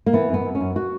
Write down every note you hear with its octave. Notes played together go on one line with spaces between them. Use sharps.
A#3
E3 B3
F#2 B3
F#2
C#4
F#2
F#4